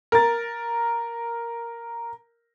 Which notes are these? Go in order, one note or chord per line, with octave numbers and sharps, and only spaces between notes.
A#4 A6